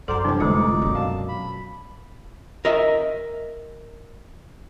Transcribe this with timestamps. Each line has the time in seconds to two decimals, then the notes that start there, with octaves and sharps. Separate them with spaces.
0.08 F#2 A4 C5 D5 F#5 A#5
0.25 C2 E3 D4 G4 C5
0.40 F1 D3 G#3 D#4 F4 D5
0.82 F#2 B2
0.95 F5 A5
1.29 B5
2.65 A#4 D#5 E5